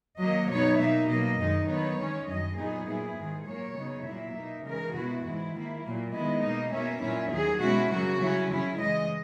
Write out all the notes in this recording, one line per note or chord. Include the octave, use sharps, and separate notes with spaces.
D#3 F#3 A#3 D#5
B2 F#3 B3 D#4 C#5
B2 A#3 D#4 E5
B2 F#3 A#3 D#5
F#2 D#3 G#3 D#4
D#3 F#3 B3 D#4 C#5
D#3 G#3 C#4
F#2 D#3 F#3 D#5
A#2 F#3 B3 D#4 G#4
A#2 F#3 B3 E4
G#2 D#3 G#3
A#2 F#3 A#3 C#5
C#3 F#3 B3 D#4
A#2 F#3 A#3 E4 E5
B2 A#3 D#4
C#3 E3 G#3 A#4
B2 G#3 B3 E4 F#4
G#2 E3 G#3 E4
D#3 A#3 E4
A#2 F#3 A#3
D#3 G#3 B3 E4 D#5
B2 A#3 D#4
B2 A#3 C#4 E5
A#2 F#3 C#4 E4
D#2 D#3 F#3 G#4
B2 G#3 C#4 E4 F#4
C#3 F#3 A#3 F#4
C#3 F#3 C#4 E4
C#3 F#3 C#4 E4
C#3 E3 G#3 D#5